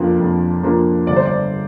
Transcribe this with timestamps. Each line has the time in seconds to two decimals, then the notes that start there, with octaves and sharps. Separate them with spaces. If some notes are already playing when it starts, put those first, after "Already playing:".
Already playing: F2 F3 A#3 D4 F5
0.20 F2
0.63 F3 A#3 D4
1.07 G1 D5
1.16 C5
1.25 D5